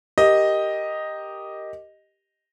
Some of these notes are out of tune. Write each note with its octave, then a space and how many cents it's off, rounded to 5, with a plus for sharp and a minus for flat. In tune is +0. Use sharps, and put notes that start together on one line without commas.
G4 +0 A#4 +0 D#5 +0